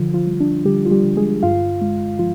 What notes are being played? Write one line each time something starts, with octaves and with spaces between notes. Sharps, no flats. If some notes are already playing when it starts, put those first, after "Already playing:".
Already playing: D3 F3 F4
F3 F4
G3
D4
D3 G3 G4
F4
G3 G4
D3
G#3 G#4
G2 F4 F5
G#3
F3 F4